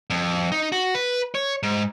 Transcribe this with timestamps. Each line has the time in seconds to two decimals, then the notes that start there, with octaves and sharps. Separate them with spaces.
0.10 F2
0.52 D#4
0.72 F#4
0.95 B4
1.35 C#5
1.63 G#2